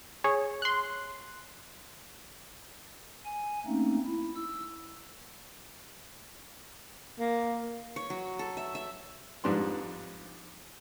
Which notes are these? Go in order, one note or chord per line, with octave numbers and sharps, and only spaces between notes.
G#4 C#5
C6 F#6
G#5
A3 A#3 C4 C#4 D#4
E4
E6
A#3
C#5
F#3
A4
E5
E5
F2 G#2 G3 D4 B4 C6